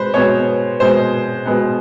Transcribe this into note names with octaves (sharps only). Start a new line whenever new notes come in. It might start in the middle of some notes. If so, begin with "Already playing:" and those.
Already playing: B2 G#3 B4 C5
B2 G#3 B3 C#5
B2 G#3 B3 C5
B2 G#3 B3